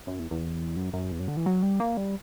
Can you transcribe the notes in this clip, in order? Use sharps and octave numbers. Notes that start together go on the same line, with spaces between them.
F#2
E2
E2
F#2
F#2
E2
F#2
D3
E3
F#3
G3
A#3
G3